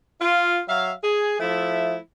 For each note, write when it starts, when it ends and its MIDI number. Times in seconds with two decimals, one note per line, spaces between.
0.21 0.61 65
0.68 0.93 54
0.68 0.93 76
0.68 0.93 77
1.04 1.37 68
1.40 1.98 53
1.40 1.98 57
1.40 1.98 64
1.40 1.98 76